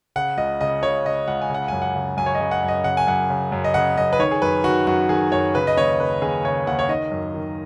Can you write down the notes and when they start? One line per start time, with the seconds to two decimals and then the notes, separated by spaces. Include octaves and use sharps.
0.16 C#3 F#5
0.38 C#2 D#5
0.61 C#3 D#5
0.83 C#2 C#5
1.05 C#3 D#5
1.28 C#2 F#5
1.42 G#5
1.50 C#3 F#5
1.68 F#2 G#5
1.82 F#5
1.95 C#3
2.17 F#2 G#5
2.26 C#5
2.35 C#3 D#5
2.51 F#5
2.63 F#2
2.68 D#5
2.84 C#3 F#5
2.97 G#5
3.07 F#2 F#5
3.30 C#3
3.52 F#2
3.64 D#5
3.74 C#3 F#5
3.97 F#2 D#5
4.13 B4
4.19 D#3 C#5
4.31 G#4
4.42 F#2 B4
4.64 D#3 F#4
4.87 F#2 F#4
5.09 D#3 G#4
5.32 F#2 C#5
5.55 C#3 B4
5.67 D#5
5.77 D#2 C#5
5.99 C#3 B4
6.22 D#2 G#4
6.44 C#3 C#5
6.67 D#2 F#5
6.79 C#5
6.89 D#3 D#5
7.12 F#2
7.35 D#3